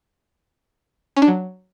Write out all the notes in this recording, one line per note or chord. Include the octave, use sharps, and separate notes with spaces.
C#4
D4
F#3